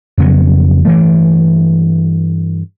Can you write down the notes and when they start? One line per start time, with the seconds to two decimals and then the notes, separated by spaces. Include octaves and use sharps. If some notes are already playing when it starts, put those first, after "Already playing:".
0.18 F2 C#3 F#3 B3
0.85 G2 E3 A3